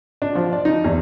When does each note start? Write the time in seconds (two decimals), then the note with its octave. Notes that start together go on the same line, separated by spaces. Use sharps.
0.22 D4
0.35 F3
0.53 D5
0.65 D#4
0.84 E2